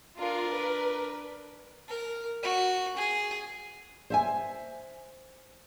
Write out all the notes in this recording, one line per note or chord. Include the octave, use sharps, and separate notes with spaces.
D4 F4 A#4
B4
A#4
F#4
G#4
C5 E5 G#5